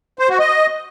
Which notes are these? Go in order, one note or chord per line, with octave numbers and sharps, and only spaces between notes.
C5
F#4
D#5